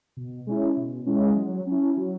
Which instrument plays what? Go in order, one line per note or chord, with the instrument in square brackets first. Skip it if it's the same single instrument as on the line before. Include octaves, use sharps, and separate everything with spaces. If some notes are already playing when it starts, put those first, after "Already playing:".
[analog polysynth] B2
G#3 C#4 E4
B2
G#3 C#4 E4
F#3
C#4 E4
F#3